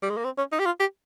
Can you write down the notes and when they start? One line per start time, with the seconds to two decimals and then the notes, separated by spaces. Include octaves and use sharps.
0.02 G3
0.10 G#3
0.17 A#3
0.25 C4
0.38 C#4
0.52 D#4
0.59 G4
0.66 F4
0.80 G4